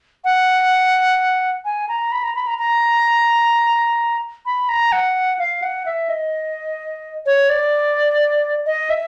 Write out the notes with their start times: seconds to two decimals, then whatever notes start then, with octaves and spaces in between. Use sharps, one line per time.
0.25 F#5
1.65 G#5
1.89 A#5
2.12 B5
2.23 A#5
2.35 B5
2.47 A#5
2.59 A#5
4.46 B5
4.69 A#5
4.92 F#5
5.39 F5
5.62 F#5
5.86 E5
6.09 D#5
7.26 C#5
7.49 D5
8.66 D#5
8.90 E5